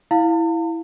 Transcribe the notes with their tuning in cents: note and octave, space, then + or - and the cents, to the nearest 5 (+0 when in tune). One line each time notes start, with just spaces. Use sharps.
E4 +0 F5 +10 A5 +45